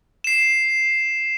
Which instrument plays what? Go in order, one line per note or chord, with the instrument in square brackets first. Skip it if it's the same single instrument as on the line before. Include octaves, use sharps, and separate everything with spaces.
[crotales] C7 E7